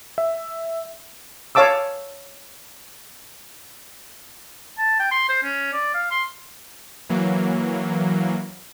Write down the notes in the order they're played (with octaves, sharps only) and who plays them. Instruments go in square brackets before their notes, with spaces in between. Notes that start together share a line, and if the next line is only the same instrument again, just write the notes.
[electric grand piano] E5
[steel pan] C#5 F5 A5 D6 E6
[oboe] A5
G5
C6
C5
C#4
D5
F5
C6
[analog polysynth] E3 F#3 A#3